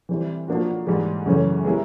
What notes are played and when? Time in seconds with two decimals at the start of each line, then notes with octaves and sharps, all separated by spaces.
0.09 E3 G3 C4 E4
0.48 F3 A#3 D4 F#4
0.86 G#2 E3 G3
1.26 F#2 C#3 E3 A3 C#4
1.65 G#3 B3 E4 G4 A#4